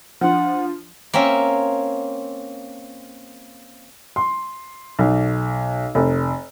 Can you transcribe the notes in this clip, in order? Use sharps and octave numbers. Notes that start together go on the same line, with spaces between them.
F3 D4 F#5 C6
A#3 C4 C#4 E5
C6
B1
F1